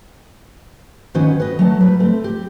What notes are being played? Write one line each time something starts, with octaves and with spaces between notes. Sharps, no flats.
D#3 B3 C#4 F#4 B4 C5
B4 D#5
F#3 A3 G#5 A5
G3 B4
A3 C4
G4